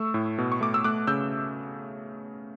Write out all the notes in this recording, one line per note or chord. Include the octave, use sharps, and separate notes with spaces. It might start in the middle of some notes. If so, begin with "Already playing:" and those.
Already playing: A3 C#6 E6
A2
B2
C#6
A3 D6
E6
A3 D6 F#6
C#3 E6 G6